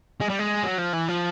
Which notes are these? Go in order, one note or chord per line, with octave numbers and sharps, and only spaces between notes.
G#3
G3
G#3
F#3
F3
E3
F3